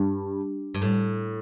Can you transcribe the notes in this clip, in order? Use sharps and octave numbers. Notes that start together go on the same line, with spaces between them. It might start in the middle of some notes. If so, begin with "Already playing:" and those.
Already playing: G2
G2
A2